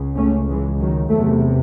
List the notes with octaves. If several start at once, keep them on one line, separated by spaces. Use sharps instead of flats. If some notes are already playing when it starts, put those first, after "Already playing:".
Already playing: C#2 C#3
A3 C#4
E3 G#3
D#3 F#3
E2 C3 F#3 A3